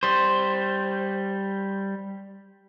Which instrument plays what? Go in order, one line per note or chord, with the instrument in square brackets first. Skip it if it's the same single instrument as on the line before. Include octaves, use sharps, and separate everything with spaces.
[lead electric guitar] G3 C5